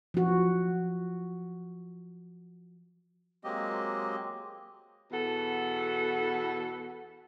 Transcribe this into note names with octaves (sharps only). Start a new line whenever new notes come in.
F3 F#4
F#3 G#3 A#3 C4 G4 D#5
E2 B2 F#4 A4 F#5